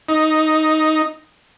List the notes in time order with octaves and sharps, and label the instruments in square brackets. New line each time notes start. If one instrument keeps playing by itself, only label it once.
[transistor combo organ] D#4